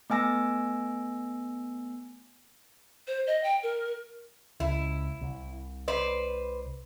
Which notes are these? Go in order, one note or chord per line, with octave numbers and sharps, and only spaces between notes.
A3 B3 G#5 E6 A#6
C5
D#5
G5
A#4
C#2 E4
C2
B4 C5 D5